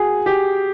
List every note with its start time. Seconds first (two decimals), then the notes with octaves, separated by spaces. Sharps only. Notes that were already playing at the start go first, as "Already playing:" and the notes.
Already playing: F#4 G#4
0.26 G4